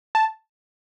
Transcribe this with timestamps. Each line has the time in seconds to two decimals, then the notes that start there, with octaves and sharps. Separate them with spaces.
0.15 A5